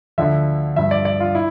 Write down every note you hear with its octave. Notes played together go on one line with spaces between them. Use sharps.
D2 D3 F3 E5
G2 F3 E5
D5
D5
F4
E4